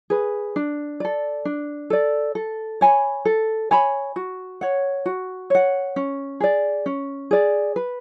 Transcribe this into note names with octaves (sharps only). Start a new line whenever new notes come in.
G#4 B4
D4
A4 D5
D4
A4 D5
A4
C#5 G#5 B5
A4
C#5 G#5 B5
F#4
C#5 F#5
F#4
C#5 F#5
C#4
G#4 D5
C#4
G#4 D5
B4